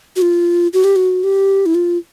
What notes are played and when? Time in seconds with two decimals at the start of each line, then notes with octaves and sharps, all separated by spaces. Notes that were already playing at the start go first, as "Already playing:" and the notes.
0.16 F#4
0.22 F4
0.73 F#4
0.84 G4
0.96 F#4
1.24 G4
1.66 E4
1.75 F4